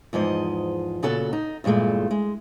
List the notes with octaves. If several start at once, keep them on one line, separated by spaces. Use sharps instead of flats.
E2 G#2 F3 D#5
A#2 C#3 B3 F#4 A4 F#5
D#4
E2 G2 A#2 G#3 A3
G#3